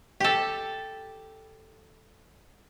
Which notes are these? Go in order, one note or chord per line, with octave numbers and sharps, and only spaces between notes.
G4 A4